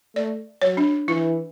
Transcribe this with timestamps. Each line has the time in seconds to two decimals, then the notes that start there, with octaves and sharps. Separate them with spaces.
0.16 A3 D5
0.62 F#3 C#5
0.77 D4
1.08 E3 E4